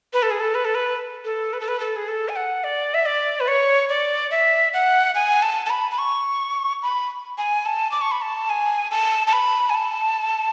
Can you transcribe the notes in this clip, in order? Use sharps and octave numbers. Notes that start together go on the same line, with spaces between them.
B4
A4
G#4
A4
B4
A4
B4
A4
B4
A4
B4
A4
G#4
A4
G#5
F#5
D5
E5
D5
B4
C#5
D5
E5
F#5
G#5
A5
A5
B5
B5
C#6
B5
G#5
A5
D6
C#6
B5
A5
G#5
A5
A5
B5
G#5
A5